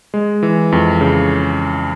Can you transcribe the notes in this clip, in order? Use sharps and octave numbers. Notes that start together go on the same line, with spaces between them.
G#3
E3
F2
C#3